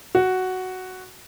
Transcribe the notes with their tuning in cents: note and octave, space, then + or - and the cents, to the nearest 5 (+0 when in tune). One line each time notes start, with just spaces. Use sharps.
F#4 +5